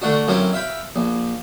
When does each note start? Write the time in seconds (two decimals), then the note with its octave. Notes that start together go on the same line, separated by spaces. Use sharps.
0.02 D3 A3 D4 F#4
0.27 F#2 A#3 C4 C#4 E4
0.53 E5 F5 G5 B5
0.96 A#1